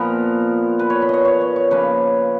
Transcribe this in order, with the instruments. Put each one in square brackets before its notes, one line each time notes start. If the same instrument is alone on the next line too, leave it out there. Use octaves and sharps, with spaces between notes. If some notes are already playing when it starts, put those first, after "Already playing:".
Already playing: [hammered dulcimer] A#2 F3 B3 A#4
B4
C#5
B4
C#5 D#5
C#5
C#5
C#5
C#3 F3 A#3 B4